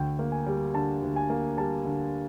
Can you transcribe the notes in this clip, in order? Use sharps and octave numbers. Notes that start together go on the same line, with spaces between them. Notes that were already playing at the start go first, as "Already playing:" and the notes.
Already playing: D2 G5
A#3
G#5
G3
D3 A5
D2
G#5
A#3
G3 A5
D3